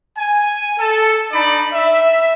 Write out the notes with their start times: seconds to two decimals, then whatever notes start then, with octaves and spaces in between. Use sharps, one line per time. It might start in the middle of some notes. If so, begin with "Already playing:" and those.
0.17 G#5
0.78 A4
1.31 D4 D#4 D5 B5
1.73 E5